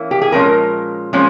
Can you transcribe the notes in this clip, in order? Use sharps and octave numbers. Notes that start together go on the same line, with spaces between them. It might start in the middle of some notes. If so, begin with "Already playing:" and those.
Already playing: E3 A#3 C#4
G4
G#4
A#2 F3 G#3 C#4 A#4
A#2 F3 G#3 C#4